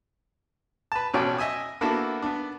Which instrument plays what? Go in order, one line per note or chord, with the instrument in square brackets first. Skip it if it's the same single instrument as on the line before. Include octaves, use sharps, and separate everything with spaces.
[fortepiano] B4 A5
A1 F2 B2 C#4 D5 G5
D#5 E5 G#5 D#6
A#3 B3 D4 E4 F#4 A4
B3 D4